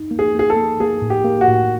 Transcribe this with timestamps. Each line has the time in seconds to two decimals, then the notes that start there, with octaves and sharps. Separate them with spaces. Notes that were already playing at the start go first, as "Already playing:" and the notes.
Already playing: D#4
0.11 A#3
0.19 G#4
0.34 A#3 G#4
0.50 A4
0.56 A#3
0.80 A#3 G#4
1.02 A2
1.10 G4
1.25 A#3
1.41 F#4
1.48 A2